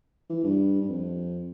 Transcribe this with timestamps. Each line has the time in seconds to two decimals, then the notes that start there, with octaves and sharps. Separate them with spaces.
0.30 E3
0.44 G2
0.81 G2
0.89 F2